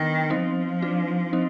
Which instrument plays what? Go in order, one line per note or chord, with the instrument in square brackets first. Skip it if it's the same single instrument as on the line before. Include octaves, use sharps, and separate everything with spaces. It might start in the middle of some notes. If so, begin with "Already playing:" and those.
Already playing: [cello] D#3 [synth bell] B3 D4
[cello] F3 [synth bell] C4 D#4
[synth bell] D4 F4
C4 D#4